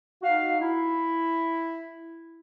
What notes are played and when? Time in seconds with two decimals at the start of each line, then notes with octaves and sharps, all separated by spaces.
0.23 D#4 F#4 F5
0.61 E4